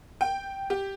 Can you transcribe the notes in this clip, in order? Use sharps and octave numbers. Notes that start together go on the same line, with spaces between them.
G5
G4